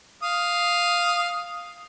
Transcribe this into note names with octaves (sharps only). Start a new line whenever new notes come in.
F5 D#6